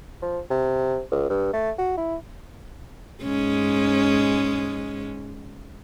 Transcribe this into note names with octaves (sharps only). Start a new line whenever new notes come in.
F3
C3
C#2
G2
A3
F#4
E4
G#2 G#3 C#4